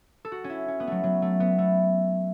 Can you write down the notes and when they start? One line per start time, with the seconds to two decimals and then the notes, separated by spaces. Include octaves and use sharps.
0.25 A4
0.32 F#4
0.44 C#4
0.50 E4
0.68 C#4
0.80 B3
0.87 F#3 A3
1.04 F#3
1.22 A3
1.40 B3
1.58 A3